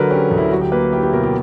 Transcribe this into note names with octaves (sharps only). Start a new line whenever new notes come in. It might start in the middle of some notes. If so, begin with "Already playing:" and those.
Already playing: D3 F#3 A#4 B4
C#4 G4
D2
E4
F#3 F#4
G4
A#3 B4
E4 G4
G4
B2 A#4
G4